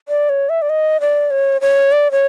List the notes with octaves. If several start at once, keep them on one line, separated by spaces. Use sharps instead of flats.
D5
C#5
E5
D5
D#5
D5
C#5
C#5
D5
C#5